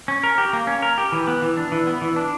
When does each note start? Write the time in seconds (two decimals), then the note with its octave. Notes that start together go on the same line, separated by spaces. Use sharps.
0.08 C#4
0.24 A#4
0.38 G4
0.53 A#3
0.67 C#4
0.82 A#4
0.98 G4
1.12 E3
1.27 B3
1.42 E3
1.57 D4
1.72 E3
1.87 B3
2.01 E3
2.16 D4